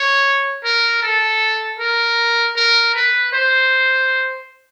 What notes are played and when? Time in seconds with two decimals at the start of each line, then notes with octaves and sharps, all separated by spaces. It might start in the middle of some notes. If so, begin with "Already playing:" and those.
Already playing: C#5
0.64 A#4
1.02 A4
1.79 A#4
2.56 A#4
2.94 B4
3.32 C5